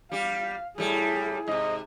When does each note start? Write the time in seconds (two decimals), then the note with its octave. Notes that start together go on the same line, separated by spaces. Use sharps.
0.12 G3 G4 F5
0.78 A2 G3 E4 G#4
1.48 G#2 C3 D#5